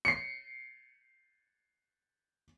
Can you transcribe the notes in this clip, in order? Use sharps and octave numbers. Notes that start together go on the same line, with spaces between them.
C7 C#7